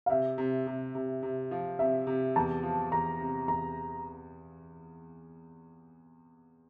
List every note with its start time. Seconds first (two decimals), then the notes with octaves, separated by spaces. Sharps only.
0.06 F5
0.09 C3 E5
0.38 C3
0.67 C3
0.95 C3
1.23 C3
1.51 F3
1.79 C3 E5
2.07 C3
2.36 E2 A5
2.63 F3
2.92 E2 A#5
3.20 C3
3.48 E2 A#5